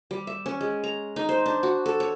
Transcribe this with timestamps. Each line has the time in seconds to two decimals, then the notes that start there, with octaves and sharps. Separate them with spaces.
0.11 G3
0.27 E5
0.46 C#4
0.61 G#3
0.84 A#5
1.16 D#4
1.29 C5
1.46 D4
1.63 F#4
1.86 A4
2.00 C#5